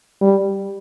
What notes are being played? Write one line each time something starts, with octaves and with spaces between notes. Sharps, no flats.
G3